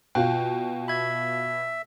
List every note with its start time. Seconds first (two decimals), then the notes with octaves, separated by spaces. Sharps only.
0.15 B2 F4 F5 G5 F#6
0.88 E5 B5 G#6